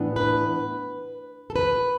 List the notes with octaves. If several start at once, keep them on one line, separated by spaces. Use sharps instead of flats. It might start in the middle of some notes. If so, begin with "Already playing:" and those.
Already playing: A2 E3 B3 D4
B4
A4
B4